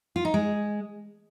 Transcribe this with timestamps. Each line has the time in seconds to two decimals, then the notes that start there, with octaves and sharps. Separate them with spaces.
0.16 F4
0.25 D#4
0.34 G#3